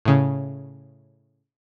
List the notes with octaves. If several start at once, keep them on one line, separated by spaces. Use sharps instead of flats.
A2 C#3